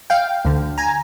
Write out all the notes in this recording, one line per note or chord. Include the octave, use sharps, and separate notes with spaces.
F5 G5
D2 D3
G#5 A#5